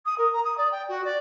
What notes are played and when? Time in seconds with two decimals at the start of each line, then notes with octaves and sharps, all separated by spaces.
0.05 D#6
0.18 A#4
0.32 A#5
0.44 D#6
0.57 D5
0.71 G5
0.88 F#4
1.04 D5